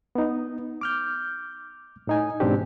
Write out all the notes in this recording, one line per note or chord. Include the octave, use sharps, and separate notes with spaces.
B3 D#4
D6 F6 G6
A2 D#4 G#5
G#2 B2 E3 C4 D4 G4